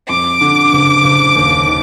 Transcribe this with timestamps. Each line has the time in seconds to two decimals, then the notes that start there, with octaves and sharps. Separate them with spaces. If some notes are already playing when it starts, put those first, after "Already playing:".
0.09 F2 D6
0.41 D3
0.73 F#1
1.04 F#1
1.36 D#2
1.67 D#3